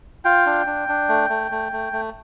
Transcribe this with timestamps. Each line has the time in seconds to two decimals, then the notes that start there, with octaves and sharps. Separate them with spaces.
0.25 F4 G5
0.46 D4
0.67 D4
0.88 D4
1.09 A3
1.30 A3
1.51 A3
1.72 A3
1.93 A3